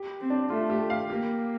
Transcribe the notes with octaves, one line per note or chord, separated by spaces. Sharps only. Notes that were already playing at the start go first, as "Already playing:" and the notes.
Already playing: G4
C4
D4
A3 F4
G4
F5
A#3 G4